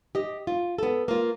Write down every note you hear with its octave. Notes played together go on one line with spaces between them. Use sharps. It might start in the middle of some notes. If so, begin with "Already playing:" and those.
G4 D#5
F4
B3 A4
A#3 F4